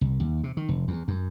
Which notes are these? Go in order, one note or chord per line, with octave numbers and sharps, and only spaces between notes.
C2
D#2
C3
D#3
F1
E2
F#2